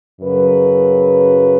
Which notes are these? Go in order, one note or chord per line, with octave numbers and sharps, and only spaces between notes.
F#2 C#3 F#3 B4